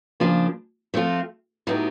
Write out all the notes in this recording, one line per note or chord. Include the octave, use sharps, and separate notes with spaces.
C#3 F3 A#3 D4
F3 A3 C4 F4
A2 F#3 B3 D#4 G4